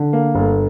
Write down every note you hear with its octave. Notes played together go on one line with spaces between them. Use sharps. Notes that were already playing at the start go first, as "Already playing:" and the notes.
Already playing: D3
A#3
G1